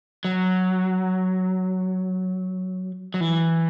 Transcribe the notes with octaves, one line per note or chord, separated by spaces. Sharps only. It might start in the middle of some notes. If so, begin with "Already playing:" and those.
F#3
F#3
E3